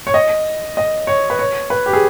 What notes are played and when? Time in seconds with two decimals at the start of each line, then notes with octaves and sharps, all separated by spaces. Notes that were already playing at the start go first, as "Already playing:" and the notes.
0.07 C#5
0.14 D#5
0.77 D#5
1.07 C#5
1.30 B4
1.39 C#5
1.70 B4
1.86 G4
1.93 G#4